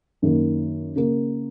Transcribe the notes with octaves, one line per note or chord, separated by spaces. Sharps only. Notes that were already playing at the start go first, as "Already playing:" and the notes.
F#2 D#3 A#3
C#3 A#3